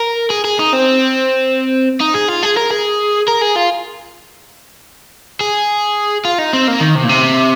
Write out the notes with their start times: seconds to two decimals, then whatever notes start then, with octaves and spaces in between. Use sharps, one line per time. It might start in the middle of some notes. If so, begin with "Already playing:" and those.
Already playing: A#4
0.30 G#4
0.45 G#4
0.59 D#4
0.73 C4
2.01 D#4
2.15 G#4
2.29 F4
2.43 G#4
2.57 A#4
2.71 G#4
3.28 A#4
3.42 G#4
3.56 F4
5.40 G#4
6.25 F4
6.39 D#4
6.53 C4
6.68 A#3
6.81 D#3
6.96 C3
7.04 A#2
7.09 C3